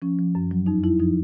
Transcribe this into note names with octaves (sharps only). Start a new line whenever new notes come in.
F3 C#4
F3
F#2
F#3
F2 D#4
F2 E4
F3 D#4